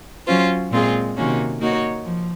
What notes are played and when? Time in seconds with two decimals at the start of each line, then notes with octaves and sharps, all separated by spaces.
0.27 F#3 C#4 F4 C5
0.71 A#2 G#3 C4 F4 G#4
1.16 C3 D#3 A#3 C#4 F#4
1.60 A#3 D#4 F#4 C#5
2.05 F3